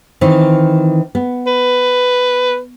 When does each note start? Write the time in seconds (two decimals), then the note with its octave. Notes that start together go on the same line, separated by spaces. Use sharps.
0.21 D#3 E3 C4
1.15 B3
1.47 B4